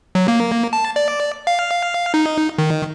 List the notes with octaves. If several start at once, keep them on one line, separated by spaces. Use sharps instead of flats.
F#3
A#3
A5
D5
F5
D#4
D#3